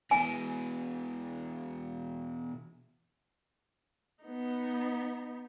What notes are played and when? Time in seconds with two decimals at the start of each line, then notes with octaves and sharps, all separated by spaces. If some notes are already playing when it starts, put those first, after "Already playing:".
0.11 B2 E3 G#5
4.24 B3 D#4